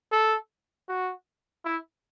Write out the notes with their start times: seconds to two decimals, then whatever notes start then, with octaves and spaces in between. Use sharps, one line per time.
0.12 A4
0.88 F#4
1.65 E4